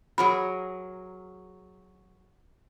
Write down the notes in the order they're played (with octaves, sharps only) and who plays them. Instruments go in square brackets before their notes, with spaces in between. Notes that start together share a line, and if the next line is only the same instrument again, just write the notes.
[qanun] F#3 G#4 A#4 [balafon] B5